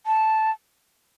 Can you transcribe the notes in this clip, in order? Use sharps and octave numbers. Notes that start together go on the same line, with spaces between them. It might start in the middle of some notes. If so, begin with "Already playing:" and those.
A5